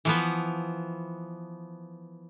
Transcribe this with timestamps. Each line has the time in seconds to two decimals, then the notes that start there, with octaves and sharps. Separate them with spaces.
0.05 E3 F3 B3